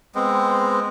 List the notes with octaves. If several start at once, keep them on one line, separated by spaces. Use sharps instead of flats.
G#3 B3 C4